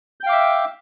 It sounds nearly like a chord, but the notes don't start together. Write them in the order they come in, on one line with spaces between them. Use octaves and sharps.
G6 G5 F5 D6 E5